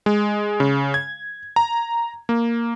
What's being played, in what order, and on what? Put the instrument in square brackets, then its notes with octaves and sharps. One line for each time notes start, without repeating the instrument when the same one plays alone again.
[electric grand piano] G#3
C#3
G#6
A#5
A#3